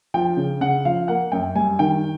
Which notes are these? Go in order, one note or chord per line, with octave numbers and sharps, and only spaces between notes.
F3 G5
C#3
C#3 F#5
F3 F5
A#3 F#5
F#2 G5
G3 G#5
D#3 G5